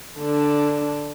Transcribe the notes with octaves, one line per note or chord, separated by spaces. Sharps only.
D3 D4